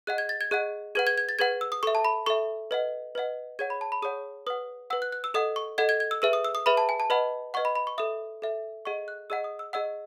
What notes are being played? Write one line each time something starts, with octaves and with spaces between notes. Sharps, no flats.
G#4 D#5 F#5 F#6
G#6
A6
G#6
G#4 D#5 F#5 F#6
G#4 B4 F#5 G#6
G#6
G#6
A6
G#4 B4 F#5 G#6
E6
D#6
A4 E5 C#6
A5
B5
A4 E5 C#6
B4 D#5 F#5
B4 D#5 F#5
G#4 C#5 F#5 G#6
B5
A5
B5
G#4 C#5 F#5 D#6
B4 F#5 D#6
B4 F#5 E6
F#6
F#6
E6
A4 D#5 F#5 D#6
C#6
A4 D#5 F#5 G#6
G#6
G#6
E6
G#4 B4 E5 E6
D#6
E6
D#6
G#4 B4 E5 B5
A5
G#5
A5
B4 D#5 F#5 B5
B4 D#5 F#5 C#6
B5
B5
C#6
A4 E5 D#6
A4 E5
G#4 D#5 F#5 C#6
F#6
G#4 D#5 F#5 E6
D#6
E6
G#4 D#5 F#5 E6